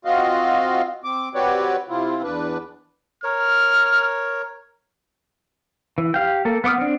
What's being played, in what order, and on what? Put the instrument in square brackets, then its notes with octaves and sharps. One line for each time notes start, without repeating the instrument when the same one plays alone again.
[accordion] C4 F4 F#4 D#5 F5
C4 D6
C4 F#4 G4 B4 C#5 D5
C3 C4 E4 F4
E2 D4 B4
[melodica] A#4 C#5 [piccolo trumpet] F6
[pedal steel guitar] E3
G4 F5 G5
A#3 A4
B3 F#5 D6 D#6 F6
C4 D4